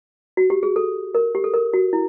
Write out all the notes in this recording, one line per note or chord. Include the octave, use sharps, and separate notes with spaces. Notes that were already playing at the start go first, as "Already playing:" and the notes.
F#4
G4
G#4
A4
A#4
G4
A4
A#4
F#4
E4